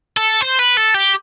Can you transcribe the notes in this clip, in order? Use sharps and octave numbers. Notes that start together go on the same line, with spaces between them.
A4
C5
B4
A4
G4